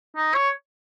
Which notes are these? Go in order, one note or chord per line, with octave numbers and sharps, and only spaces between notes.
D#4
C#5